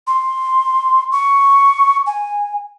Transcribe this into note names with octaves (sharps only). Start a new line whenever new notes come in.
C6
C#6
G#5